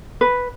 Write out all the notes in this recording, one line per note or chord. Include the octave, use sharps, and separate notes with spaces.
B4